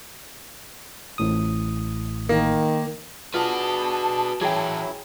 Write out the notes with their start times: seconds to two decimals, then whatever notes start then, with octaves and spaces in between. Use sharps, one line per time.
1.18 A1 A2 D#6
2.29 D#3 A#3
3.34 D4 F4 F#4 G#4 B4 A5
4.41 E3 F#3 C#4 E4 G#4 G5